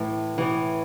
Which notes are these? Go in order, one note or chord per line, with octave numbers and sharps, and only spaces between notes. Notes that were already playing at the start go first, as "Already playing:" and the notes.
Already playing: A2 E3
A2 E3